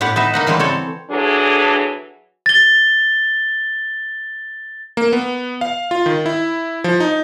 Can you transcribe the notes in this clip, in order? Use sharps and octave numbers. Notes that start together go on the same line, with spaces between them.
A2 B3 G4 F#5
B3 D#4 E5
A#3 D#4 F#5
C#3 E3 G3 G#3 B3 C4
C4 A4 C#5
E3 F#3 D4 G#4 A4
A6 G7
A#3
B3
F5
F4
D#3
E4
F3
D#4